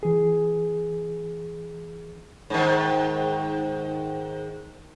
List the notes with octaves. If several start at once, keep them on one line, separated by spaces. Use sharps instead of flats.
E3 G#4
G#2 D#3